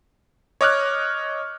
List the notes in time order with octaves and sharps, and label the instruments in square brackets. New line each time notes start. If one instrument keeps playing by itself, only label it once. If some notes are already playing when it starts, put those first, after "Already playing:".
[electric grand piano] C#5 D#5 D6 F6 F#6